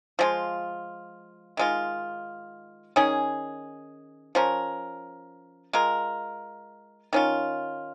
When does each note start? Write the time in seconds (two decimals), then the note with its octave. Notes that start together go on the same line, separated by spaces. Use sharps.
0.19 F3 G#3 F4
1.57 D#3 G#3 F4
2.96 D#3 C#4 G#4
4.35 F3 C#4 A#4
5.73 G#3 F4 A#4
7.13 D#3 C#4 F4